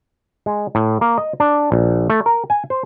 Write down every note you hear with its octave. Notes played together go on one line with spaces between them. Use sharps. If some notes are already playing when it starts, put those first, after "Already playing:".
G#3
A2
A#3
D#5
D4
A#1
A3
A#4
G#5
C5